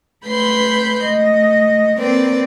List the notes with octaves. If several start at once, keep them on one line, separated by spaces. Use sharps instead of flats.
A3 B4 B5 C6 G6
A3 D#5
A#3 C4 B4 D5